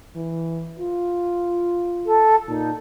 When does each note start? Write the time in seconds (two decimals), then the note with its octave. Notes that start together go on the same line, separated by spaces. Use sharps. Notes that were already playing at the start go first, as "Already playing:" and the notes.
0.15 E3
0.80 F4
2.06 A4
2.48 A#2 D#4